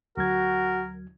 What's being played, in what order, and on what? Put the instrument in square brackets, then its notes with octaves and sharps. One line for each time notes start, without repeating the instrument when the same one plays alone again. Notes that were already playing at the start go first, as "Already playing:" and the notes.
[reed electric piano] D2 F#3 G#6 [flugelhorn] F#4 [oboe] A#4